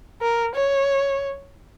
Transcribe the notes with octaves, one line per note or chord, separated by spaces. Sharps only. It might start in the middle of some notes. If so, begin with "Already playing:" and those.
A#4
C#5